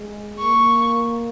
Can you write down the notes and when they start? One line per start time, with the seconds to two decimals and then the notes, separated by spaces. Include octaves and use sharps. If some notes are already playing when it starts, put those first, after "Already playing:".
Already playing: G#3
0.39 A#3 C#6